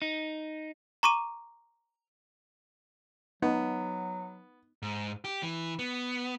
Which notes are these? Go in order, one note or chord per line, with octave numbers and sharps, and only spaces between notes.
D#4
A#5 C#6 D6 D#7
F#3 B3 D#4
G#2
G4
E3
B3